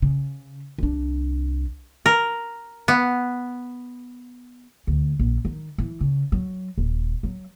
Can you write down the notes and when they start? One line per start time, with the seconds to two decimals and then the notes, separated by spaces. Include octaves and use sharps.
0.02 C#3
0.78 C2 D4
2.06 A#4
2.88 B3
4.87 D2
5.19 A#1
5.45 D#3
5.78 E3
6.00 C#3
6.32 F#3
6.78 D#1
7.23 F#3